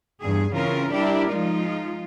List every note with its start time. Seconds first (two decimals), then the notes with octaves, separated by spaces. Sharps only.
0.22 E2 G2 G#4
0.53 C#3 E3 C4 C#4 F4 A#4
0.93 G3 D4 E4 G4 A#4 D5
1.31 F3 G#3 D#4 F4